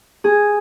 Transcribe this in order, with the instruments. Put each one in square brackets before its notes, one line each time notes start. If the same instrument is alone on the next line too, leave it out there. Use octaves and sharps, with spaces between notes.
[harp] G#4